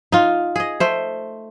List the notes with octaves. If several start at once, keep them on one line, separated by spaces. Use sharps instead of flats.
D#4 F4
G#4 D#5
A3 C5